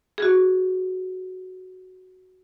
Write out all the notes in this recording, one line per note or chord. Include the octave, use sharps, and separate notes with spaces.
F#4 G#4